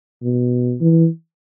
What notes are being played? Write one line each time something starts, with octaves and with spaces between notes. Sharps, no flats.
B2
E3